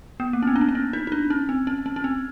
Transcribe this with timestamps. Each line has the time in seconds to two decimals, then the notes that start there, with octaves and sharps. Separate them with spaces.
0.20 B3
0.33 A#3
0.43 C#4
0.47 C4
0.56 D4
0.61 C#4
0.69 D4
0.75 C#4
0.93 D#4
1.07 D#4
1.12 D4
1.30 C#4
1.49 C4
1.67 C#4
1.86 C#4
1.96 C#4
2.04 C4